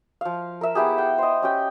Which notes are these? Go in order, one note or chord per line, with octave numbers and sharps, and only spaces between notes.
F3 F5
A#4 E5
B3 E4 G4 G#4
F#5 G5
C5 D#5
C#4 G4 G5